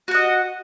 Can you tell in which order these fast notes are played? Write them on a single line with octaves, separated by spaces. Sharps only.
F#4 F#5 D#5